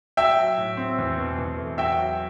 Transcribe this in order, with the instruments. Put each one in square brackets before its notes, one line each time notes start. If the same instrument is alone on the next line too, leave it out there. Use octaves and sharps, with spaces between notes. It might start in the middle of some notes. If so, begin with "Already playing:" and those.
[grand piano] F#4 [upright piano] E5 G5
[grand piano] F#3
A2
C4
E2
B2
E2
A3
[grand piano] F#4 [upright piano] E5 G5
[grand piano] F#3